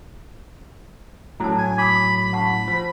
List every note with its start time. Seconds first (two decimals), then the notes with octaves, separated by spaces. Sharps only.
1.40 A2 F#3 A5 A#5
1.58 G#5
1.78 B5 D6 D#6
2.17 B5
2.33 F#5 A5 C#6
2.68 F3